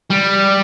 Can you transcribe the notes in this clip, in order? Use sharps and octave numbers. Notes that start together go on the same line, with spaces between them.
G3